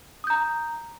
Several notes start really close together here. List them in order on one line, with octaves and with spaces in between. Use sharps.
D#6 G6 A#5